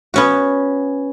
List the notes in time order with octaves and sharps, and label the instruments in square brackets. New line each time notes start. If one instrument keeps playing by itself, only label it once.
[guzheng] B3 C#4 F#4